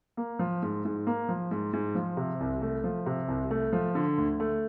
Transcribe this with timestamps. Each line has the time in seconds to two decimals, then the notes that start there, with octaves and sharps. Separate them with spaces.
0.17 A#3
0.39 F3
0.62 G#2
0.85 G#2
1.07 A#3
1.29 F3
1.51 G#2
1.73 G#2
1.95 F3
2.17 C3
2.40 C2
2.62 A3
2.84 F3
3.06 C3
3.28 C2
3.51 A3
3.73 F3
3.95 D3
4.18 D2
4.40 A3